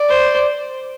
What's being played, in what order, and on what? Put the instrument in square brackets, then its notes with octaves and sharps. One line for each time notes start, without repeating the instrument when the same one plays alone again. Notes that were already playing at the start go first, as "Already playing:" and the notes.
Already playing: [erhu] D5
[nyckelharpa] C5